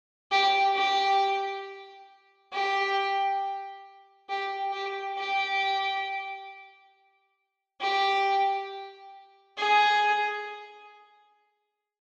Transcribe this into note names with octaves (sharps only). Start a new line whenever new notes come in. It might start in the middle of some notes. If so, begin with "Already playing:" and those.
G4
G4
G4
G4
G4
G4
G4
G#4